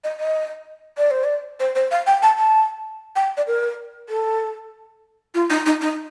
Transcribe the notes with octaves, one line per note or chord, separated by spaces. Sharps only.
D#5
D#5
D5
C5
D5
C5
C5
F5
G5
A5
A5
G5
D5
A#4
A4
F4
D#4
D#4
D#4